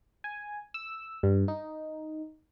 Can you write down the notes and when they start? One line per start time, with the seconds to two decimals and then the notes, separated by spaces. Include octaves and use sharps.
0.24 G#5
0.74 E6
1.23 G2
1.48 D#4